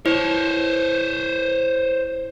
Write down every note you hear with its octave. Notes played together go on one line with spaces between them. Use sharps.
E4 C5 C#5